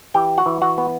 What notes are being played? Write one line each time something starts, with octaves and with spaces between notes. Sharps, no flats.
E3 G4 G5
F#4 F#5
E3
F#4 F#5
B3